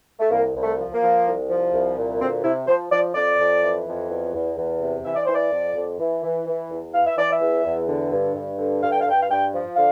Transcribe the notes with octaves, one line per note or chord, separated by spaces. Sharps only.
A3
C2 A#3
C2
A3
F3
A#3
F3
C2
F3
C2
A#2
D2 C4
C3 E4
F3 C5
F3 D5
F2 D5
F2
E3
F2
E2
E2
E2
C3
E3 E5
D5
E3 C5
D5
F2
F2
E3
E3
E3
E2
E3 F5
E5
E3 D5
E5
E2
E2
D3
G2
G2
D3
G2 F5
G5
F5
G2 G5
F5
G2 G5
F3
D3 F5